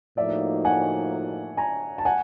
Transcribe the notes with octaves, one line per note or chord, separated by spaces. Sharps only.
A2 F3 A#3 D#4 F#4 D5 E5
F#5 G#5
G#5 A#5
A5
F#5 G#5